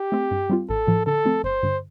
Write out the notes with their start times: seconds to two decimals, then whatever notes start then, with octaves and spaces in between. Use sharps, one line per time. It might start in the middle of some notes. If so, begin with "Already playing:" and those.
Already playing: G4
0.12 A3 C4
0.31 G2
0.50 G3 C4 F4
0.69 A1 A4
0.87 A2 F3
1.06 D3 A4
1.25 F3 A3 C4
1.44 G1 C5
1.63 G2 D3